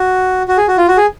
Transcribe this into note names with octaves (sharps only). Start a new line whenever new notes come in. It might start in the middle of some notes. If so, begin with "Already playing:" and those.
Already playing: F#4
F#4
G#4
F#4
F4
F#4
G#4